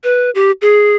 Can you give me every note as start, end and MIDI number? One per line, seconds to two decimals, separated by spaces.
0.04 0.30 71
0.35 0.51 67
0.62 0.97 68